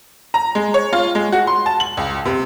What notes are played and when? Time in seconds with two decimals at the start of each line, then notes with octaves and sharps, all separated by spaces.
0.34 A#5
0.55 G#3
0.74 C#5
0.93 F4
1.15 G#3
1.32 F#4
1.47 C6
1.66 A5
1.80 F#7
1.97 C#2
2.25 C3